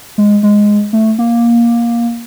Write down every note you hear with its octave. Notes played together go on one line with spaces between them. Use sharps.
G#3
G#3
A3
A#3